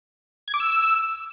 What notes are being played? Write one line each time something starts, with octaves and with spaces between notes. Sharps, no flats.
G#6
D6
E6